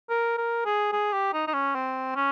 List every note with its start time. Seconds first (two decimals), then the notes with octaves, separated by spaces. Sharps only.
0.10 A#4
0.38 A#4
0.65 G#4
0.93 G#4
1.13 G4
1.33 D#4
1.47 D#4
1.53 C#4
1.75 C4
2.16 C#4